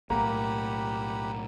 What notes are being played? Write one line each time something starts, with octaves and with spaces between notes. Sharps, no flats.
B1 A2 A#3 G4 F#5 A#5 B5